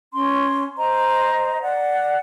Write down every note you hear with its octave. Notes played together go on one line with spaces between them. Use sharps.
C#4 C6
C5 D#5 A#5
D5 F#5